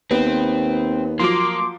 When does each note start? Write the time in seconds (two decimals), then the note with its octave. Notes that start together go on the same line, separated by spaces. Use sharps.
0.11 D#2 B3 C4
1.19 F3 F#3 A#3 C6 D6